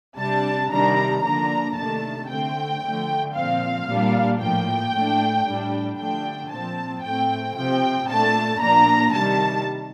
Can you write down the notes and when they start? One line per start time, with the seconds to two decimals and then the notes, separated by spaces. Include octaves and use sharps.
0.18 C3 G3 D4 A5
0.71 C3 D#3 G3 D4 A#5
1.23 D3 F3 A#3 D4 A#5
1.77 C3 D#3 A3 D4 A5
2.29 D3 A3 C4 G5
2.82 D3 F3 A3
3.34 A#2 F3 C4 F5
3.87 A#2 G3 A#3 D4
4.40 A2 F3 A#3 G5
4.93 A2 A3 D4
5.45 A2 G3 D4
5.97 D3 F3 A3 D4 G5
6.50 A#2 F3 C4 A5
7.03 A2 A3 C4 G5
7.56 C3 F3 C4 G5
8.08 A#2 A3 D4 A5
8.61 A#2 F3 A#3 D4 A#5
9.14 C3 D#3 G3 A5